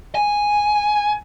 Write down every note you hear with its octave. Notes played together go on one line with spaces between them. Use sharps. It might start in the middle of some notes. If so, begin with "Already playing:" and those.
G#5